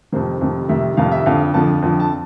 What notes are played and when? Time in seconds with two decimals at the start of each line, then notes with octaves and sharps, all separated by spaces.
0.12 F2 C3 D#3 C5
0.41 F2 C3 D#3
0.69 F2 C3 D#3 E5
0.97 F2 C3 D#3 F5
1.12 E5
1.26 F2 D3 F3 F5
1.54 F2 D3 F3 A5
1.82 F2 D3 F3
2.00 A5